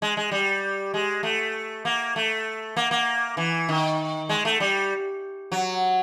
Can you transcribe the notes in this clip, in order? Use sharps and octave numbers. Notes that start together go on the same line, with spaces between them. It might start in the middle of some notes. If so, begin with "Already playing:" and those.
G#3
G#3
G3
G#3
A3
A#3
A3
A#3
A#3
E3
D#3
G#3
A3
G3
F#3